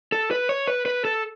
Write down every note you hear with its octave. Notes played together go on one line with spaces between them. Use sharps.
A4
B4
C#5
B4
B4
A4